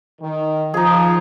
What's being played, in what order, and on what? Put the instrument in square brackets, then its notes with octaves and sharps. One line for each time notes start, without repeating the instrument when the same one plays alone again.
[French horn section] D#3
[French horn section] F3 [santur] D#4 G#4